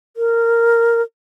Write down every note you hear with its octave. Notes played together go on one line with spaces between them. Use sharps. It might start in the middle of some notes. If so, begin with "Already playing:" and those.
A#4